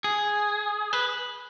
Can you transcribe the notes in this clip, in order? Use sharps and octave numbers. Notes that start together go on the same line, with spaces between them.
G#4
B4